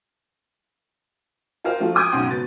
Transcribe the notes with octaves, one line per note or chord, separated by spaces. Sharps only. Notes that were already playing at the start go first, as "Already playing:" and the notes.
F4 A#4 C5 D#5 F5
F3 A3 F4
D6 D#6 G6 G#6 D7
B1 G#2 C#3 F#5 C6 D#7
B2 B3 A6